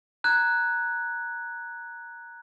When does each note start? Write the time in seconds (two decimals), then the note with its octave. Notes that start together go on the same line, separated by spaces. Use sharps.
0.24 A#5 F#6 G#6